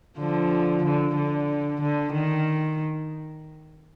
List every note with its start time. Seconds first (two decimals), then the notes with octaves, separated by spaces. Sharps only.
0.19 D3 F3
0.84 D3
1.15 D3
1.81 D3
2.13 D#3